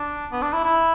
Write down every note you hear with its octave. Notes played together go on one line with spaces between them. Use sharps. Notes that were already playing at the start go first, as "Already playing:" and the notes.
Already playing: D4
B3
D4
E4
E4